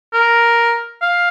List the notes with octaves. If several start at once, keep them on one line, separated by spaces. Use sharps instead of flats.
A#4
F5